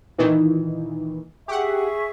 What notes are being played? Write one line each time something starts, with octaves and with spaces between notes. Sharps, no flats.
A#2 D#3 E3
G4 G#4 E5 F#5 C#6